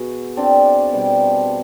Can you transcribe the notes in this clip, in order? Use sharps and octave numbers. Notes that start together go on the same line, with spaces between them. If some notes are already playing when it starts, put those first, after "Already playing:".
Already playing: B2 F#4 G#4
C4 D4
B2 G3